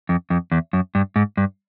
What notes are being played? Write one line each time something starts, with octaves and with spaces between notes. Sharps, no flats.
F2
F2
E2
F#2
G2
G#2
G2